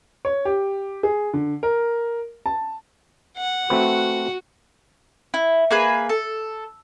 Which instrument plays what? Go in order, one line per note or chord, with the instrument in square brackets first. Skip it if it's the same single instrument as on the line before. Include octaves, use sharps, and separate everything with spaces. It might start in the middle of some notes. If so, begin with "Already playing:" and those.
[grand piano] C#5
G4
G#4
D3
A#4
A5
[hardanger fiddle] F#5
[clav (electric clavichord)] A3 C4 B4 [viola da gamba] F#4
[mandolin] E4
A#3 G#4 B4
A4